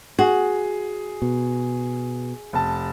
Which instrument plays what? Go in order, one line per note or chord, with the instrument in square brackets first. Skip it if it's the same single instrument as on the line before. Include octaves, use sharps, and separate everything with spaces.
[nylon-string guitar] F#4 [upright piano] G#4
[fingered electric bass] B2
[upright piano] F1 A5